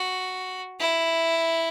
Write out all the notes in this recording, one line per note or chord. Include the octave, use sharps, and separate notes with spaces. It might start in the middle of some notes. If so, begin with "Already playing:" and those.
Already playing: F#4
E4